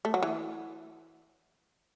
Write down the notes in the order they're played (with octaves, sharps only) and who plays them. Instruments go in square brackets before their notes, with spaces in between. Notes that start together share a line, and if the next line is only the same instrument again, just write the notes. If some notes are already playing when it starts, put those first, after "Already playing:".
[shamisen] A3
F#3
E3